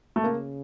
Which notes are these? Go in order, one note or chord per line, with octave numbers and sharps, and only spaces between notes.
A3
C#3 A#3